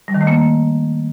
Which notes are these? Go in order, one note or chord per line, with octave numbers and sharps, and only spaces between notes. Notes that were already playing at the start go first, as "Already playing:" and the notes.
G3
D#3
A3
A#3